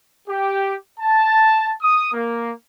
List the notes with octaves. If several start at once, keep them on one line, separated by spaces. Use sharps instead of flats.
G4
A5
D#6
A#3